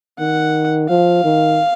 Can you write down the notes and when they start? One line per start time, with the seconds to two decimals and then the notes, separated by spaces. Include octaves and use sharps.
0.19 D#3 F#5
0.89 F3 F5
1.24 D#3